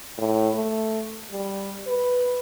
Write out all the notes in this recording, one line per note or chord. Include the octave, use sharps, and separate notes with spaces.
A2
A3
G3
B4